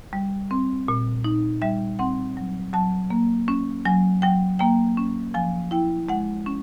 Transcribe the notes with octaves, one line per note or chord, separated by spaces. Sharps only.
G3
C4
A#2
D#4
G3 E5
C4 F#5
F#3
F#3 A5
A#3
C#4
F#3 G#5
F#3 G5
A#3 G5
C#4
F3 G#5
E4 G5
G#3 F#5
C#4